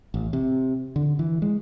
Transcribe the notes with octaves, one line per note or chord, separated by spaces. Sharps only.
A1
C3
D3
E3
G#3